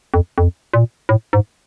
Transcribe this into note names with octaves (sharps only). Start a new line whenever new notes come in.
F2
F2
A#2
A2
G#2